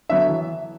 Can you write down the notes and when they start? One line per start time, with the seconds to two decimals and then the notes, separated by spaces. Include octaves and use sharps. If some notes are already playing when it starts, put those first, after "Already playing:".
0.10 D3 F#3 B3 E4 E5
0.29 E3